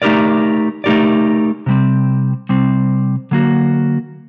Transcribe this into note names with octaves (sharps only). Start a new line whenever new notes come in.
A3 D#4 G4 A#4 D5
A3 D#4 G4 A#4 D5
C3 G3 C4
C3 G3 C4
D3 F#3 A#3 F#4